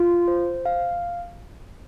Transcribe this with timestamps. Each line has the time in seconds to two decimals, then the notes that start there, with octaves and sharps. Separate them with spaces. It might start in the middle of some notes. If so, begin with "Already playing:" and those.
Already playing: F4
0.28 C5
0.66 F5